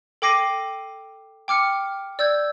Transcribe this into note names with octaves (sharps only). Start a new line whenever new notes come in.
A4 G5 D6 A#6 C7 D#7
G5 D6 F6 C#7
D5 E6 G6 G#6